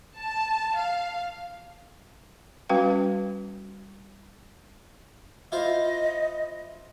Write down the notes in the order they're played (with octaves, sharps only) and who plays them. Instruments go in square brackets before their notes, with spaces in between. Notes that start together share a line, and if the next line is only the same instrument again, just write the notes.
[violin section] A5
F5
[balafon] G3 C#4 F#4 B4 F5 G5
[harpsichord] E4 F4 C5 [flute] D#5